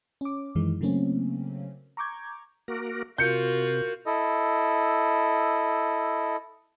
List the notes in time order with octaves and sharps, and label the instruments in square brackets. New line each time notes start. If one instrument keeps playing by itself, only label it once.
[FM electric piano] C#4 D6
F#2 D#3 E3 G#3
C#3 F#3 A3 A#3 C4 C#4
A#5 C#6 D6 G6 G#6
[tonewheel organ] A#3 F#4 A#4
[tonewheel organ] C3 [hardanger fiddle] F4 F#4 [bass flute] A#4 [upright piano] G6 C#7
[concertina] E4 A4 D#5